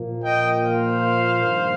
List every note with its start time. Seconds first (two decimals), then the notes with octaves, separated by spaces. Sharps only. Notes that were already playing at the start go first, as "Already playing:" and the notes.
Already playing: A#2 F3 A#3
0.24 D#5 G5
0.63 C5 F5
1.42 G2 D#3 G3 A#3